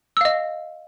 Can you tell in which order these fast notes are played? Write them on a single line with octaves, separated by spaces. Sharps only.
E6 F5 D#5